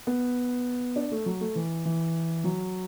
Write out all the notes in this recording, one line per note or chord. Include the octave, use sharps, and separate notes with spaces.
B3
D4
A3
F#3
A3
E3
E3
F#3